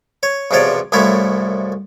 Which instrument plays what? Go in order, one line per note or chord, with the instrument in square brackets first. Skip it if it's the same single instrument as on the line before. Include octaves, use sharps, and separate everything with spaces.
[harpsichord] C#5
B1 E2 C3 F3 C#5 D5
C2 F#2 F3 A3 E4 C#5